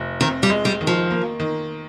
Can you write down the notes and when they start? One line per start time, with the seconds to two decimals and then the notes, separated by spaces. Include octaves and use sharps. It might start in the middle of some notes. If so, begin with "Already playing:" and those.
Already playing: F1
0.21 D#3 C4
0.43 G3
0.50 G#3
0.65 G3
0.81 D#3
0.87 F3
1.11 A#3
1.40 D#3